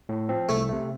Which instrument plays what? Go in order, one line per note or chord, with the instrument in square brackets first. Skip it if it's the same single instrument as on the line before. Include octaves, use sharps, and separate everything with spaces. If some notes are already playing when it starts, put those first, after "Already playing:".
[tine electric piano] A2
F3 C4
[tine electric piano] C2 [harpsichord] A3
[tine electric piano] C3 A3